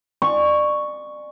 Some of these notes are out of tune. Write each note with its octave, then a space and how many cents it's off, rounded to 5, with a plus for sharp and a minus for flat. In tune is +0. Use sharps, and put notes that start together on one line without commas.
D5 +30 C#6 +0